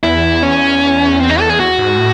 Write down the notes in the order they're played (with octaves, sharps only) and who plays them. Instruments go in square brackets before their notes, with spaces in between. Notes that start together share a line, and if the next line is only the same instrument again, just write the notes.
[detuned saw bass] E2 [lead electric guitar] E4
[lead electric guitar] C#4
C4
D#4
A4
G#4
F#4
[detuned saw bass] G#2
A2